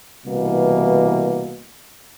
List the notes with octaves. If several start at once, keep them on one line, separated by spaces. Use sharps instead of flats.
C2 B2 E3 A#3